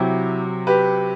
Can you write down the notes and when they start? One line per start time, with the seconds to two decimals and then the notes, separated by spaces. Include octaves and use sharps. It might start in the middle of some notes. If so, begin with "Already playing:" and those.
Already playing: C3 F#3 E4 G4
0.67 G4 B4